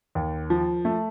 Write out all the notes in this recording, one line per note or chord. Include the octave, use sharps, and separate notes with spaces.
D#2
F3
A3